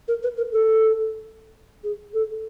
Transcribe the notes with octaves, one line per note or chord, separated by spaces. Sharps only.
A#4
B4
A#4
A4
G#4
A4